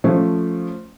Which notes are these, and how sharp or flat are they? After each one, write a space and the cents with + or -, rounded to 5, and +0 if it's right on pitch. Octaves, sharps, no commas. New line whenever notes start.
F3 +0 A3 +0 C#4 +0